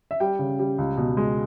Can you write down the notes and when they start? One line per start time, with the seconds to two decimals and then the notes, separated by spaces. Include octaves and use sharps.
0.11 E5
0.20 G3 G5
0.39 C#3
0.59 G3
0.78 C#2
0.98 B2
1.17 G#3